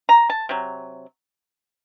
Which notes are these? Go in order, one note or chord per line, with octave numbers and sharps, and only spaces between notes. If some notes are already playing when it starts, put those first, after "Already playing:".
A#5
A5
C3 F#3